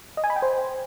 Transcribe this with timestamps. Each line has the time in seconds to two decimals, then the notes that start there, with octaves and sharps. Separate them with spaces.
0.17 D#5
0.24 G#5
0.30 B5
0.36 G5
0.42 C5